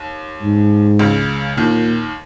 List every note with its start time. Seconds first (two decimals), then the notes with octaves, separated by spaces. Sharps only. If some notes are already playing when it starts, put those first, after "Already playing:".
Already playing: D#2
0.42 G#2
0.99 C#2 C#3
1.57 D#2 A#2 D#3